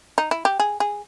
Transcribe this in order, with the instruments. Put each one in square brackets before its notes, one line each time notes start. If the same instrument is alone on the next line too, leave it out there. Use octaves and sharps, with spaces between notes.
[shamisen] D#4
E4
G4
G#4
G#4